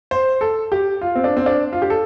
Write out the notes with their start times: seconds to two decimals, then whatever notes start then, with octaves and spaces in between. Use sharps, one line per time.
0.11 C5
0.41 A4
0.72 G4
1.01 F4
1.15 C4
1.24 D4
1.37 C4
1.46 D4
1.73 F4
1.82 G4
1.90 A4